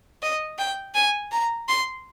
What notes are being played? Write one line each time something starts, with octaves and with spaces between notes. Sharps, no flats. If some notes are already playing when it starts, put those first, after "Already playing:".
D#5
G5
G#5
A#5
C6